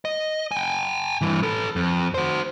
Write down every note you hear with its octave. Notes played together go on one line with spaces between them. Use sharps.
D#5
G5 G#5
G2 E3
A4 B4
F2
F#4 C5